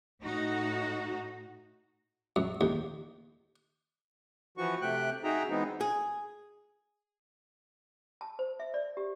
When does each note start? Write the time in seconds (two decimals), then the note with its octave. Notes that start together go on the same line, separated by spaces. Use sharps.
0.21 A2 D#4 F#4
2.36 F#2
2.61 D#2
4.57 E3 F3 F#4 C#6
4.82 C3 A3 G5 F#6
5.24 D#4 F#4 G#4 E5 G5 A#5
5.49 E3 G#3 B3 C4 D#4
5.81 G#4
8.21 A5
8.39 C5
8.60 E5
8.74 D5
8.97 G4